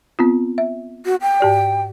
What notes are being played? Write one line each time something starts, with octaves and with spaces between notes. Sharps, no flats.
B3 C4 F4
E5
F#4
G5
G#2 G4 D5